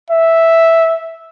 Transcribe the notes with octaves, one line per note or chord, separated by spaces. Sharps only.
E5